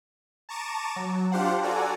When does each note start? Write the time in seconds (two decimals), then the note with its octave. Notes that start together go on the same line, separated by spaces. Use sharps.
0.49 A5 A#5 C#6 D6 D#7 E7
0.96 F#3
1.32 D4 F4 G4 C5 F5 F#5
1.63 F#4 A4 D5 G#5 A#5